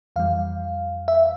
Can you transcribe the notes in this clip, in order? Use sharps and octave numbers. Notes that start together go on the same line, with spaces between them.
F2 E3 G3 F5
E5